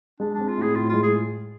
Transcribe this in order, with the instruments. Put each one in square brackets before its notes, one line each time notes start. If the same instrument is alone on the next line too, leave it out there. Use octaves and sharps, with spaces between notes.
[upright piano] G#3 [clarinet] D4
[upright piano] C4 [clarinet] D4
[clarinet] F4
[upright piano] A2 [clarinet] G#4
[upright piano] A2 [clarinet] F4
[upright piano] G#3 [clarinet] F4
[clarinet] G#4